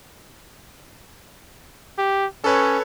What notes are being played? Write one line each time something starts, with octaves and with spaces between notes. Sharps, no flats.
G4
C#4 A4 B4 C#5